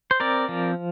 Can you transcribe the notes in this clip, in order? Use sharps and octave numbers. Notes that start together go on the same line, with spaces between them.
C5
C4 A#4 D5
F3